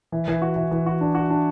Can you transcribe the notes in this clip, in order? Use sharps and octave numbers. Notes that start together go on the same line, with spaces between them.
E3
E3
F#4
E3
E3
F#4
D4
F#4
D4